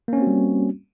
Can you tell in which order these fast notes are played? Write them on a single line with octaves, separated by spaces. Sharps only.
A#3 C#4 C4 F#4 G3